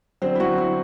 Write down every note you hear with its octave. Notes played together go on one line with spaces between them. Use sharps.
D3 F#3 C4 C5
E4
F#3 F#4
E4